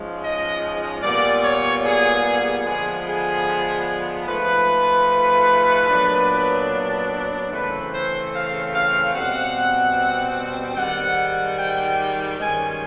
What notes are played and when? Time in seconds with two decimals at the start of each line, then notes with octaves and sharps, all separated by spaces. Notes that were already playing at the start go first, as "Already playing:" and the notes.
Already playing: G#2 F3 G#3 C#4
0.22 D#5
1.02 A#2 G3 B3 D5
1.43 C#5
1.84 G#4
2.64 D3 F3 G#3 B3 G#4
3.06 G#4
4.26 G#2 F3 A3 B4
5.89 A#2 F#3 B3 D4
7.51 C#3 E3 A3 C4 B4
7.92 C5
8.33 F5
8.73 F5
9.13 B2 G3 C4 F#5
10.76 G#2 D#3 G3 F#5
11.57 G5
12.39 G2 D#3 G#3 C#4 G#5